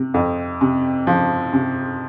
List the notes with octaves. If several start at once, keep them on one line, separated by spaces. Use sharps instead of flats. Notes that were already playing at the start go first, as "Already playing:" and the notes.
Already playing: C3
F2
C3
F3
C3